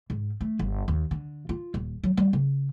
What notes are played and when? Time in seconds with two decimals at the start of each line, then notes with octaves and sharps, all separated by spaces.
0.10 G#2
0.41 A3
0.59 G1
0.88 D#2
1.11 D3
1.49 F4
1.74 D#1
2.04 F#3
2.17 G3
2.33 C#3